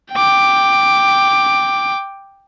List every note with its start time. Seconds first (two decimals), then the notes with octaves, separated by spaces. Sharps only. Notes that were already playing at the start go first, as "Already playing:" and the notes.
0.12 G5 D6